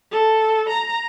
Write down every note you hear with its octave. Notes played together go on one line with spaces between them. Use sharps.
A4
A#5